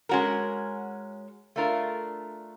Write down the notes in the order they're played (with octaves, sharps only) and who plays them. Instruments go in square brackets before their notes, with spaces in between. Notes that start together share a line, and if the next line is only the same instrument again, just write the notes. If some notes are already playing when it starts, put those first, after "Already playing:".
[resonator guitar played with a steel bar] G#3 C#4 F#4 A#4
A3 D4 F4 A#4